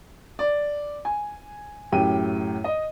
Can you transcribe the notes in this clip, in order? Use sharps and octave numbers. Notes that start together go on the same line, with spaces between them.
D5
G#5
F#2 A2 G4 G5 D#7
D#5